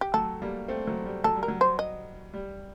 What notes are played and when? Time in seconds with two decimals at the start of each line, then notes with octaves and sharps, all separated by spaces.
0.01 G4
0.14 F#3 A3 A4
0.42 G3 A#3
0.68 A3 C4
0.87 F#3 A3
1.06 G3
1.24 F#3 A4
1.36 G3
1.43 A#4
1.48 F#3
1.61 C5
1.79 D#5
2.33 G3